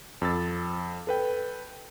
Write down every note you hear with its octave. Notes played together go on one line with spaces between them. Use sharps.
F2 E6 A6
A4 B4 G5